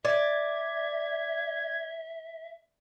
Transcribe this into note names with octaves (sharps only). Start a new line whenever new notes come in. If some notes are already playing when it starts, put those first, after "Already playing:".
D5 E5 G#6